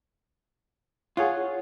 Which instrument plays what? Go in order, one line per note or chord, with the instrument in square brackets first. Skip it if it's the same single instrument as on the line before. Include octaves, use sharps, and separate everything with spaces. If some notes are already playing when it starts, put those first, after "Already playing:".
[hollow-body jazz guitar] F4 [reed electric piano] G#4 C#5 F#5